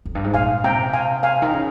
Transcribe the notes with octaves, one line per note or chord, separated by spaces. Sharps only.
F2
G2
G#2
A#2 F5 G#5
C3 G5 A#5
F5 G#5
F5 G#5
D#3
C#3